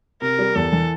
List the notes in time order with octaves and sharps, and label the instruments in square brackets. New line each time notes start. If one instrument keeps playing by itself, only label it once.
[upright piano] C3 [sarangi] A#4
[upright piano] G3
[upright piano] E2 [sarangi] A4
[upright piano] E3